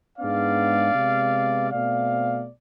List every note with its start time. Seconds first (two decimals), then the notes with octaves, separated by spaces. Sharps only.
0.18 G#2 G#3 B3 D4 D5 F5
0.94 C3 G#3 B3
1.70 B2 A3 C4 D5 F5